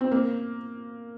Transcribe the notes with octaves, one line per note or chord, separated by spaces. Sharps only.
C4
A#3